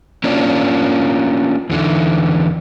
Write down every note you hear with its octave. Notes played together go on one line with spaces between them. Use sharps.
A#3 C#4 D4 F4
E2 D3 E3